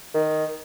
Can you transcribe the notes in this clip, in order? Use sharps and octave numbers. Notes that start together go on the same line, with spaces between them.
D#3